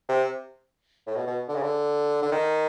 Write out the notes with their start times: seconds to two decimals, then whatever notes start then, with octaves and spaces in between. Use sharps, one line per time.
0.08 C3
1.07 A2
1.16 B2
1.27 B2
1.48 D3
1.55 C#3
1.63 D3
2.22 D3
2.32 D#3